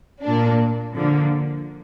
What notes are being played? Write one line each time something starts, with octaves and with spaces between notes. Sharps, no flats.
A#2 A#3 D4
D3 F3 A#3